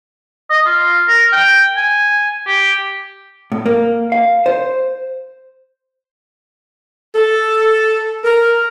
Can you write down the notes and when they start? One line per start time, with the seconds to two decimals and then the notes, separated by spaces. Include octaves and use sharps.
0.50 D#5
0.66 F4
1.08 A#4
1.32 G5
1.76 G#5
2.46 G4
3.52 A2
3.66 A#3
4.12 F5
4.46 C5
7.16 A4
8.25 A#4